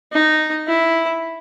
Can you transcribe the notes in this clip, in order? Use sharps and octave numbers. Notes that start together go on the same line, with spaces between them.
D#4
E4